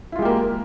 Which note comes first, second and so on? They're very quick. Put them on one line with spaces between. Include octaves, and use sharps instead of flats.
E4 F4 G#3 G4 A#3